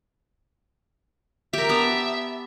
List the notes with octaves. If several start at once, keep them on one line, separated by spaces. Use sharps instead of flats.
G4 A#4 E5
B3 D4 A#5